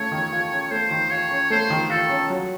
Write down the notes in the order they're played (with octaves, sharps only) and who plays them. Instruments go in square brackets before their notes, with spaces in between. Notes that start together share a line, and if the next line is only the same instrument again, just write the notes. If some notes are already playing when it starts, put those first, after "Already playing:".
Already playing: [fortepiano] A3 C#4 F4 [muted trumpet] C#5
[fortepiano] D#3
F4
C#4
[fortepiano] A3 [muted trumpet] C5
[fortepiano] D#3
[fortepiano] F4 [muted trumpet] C#5
[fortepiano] C#4
[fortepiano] A3 [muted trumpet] C5
[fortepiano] D#3
[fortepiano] F4 [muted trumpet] A4
[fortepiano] C#4
F#3